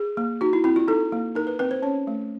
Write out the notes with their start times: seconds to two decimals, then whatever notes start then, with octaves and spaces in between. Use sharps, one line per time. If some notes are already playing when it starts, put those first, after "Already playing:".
Already playing: G#4
0.17 A#3
0.41 D#4 F#4
0.53 E4
0.64 C4 E4
0.76 F4
0.88 D#4 A4
1.12 A#3
1.35 D#4 A#4
1.47 B4
1.59 C4 B4
1.71 C5
1.82 C#4 C#5
2.07 A3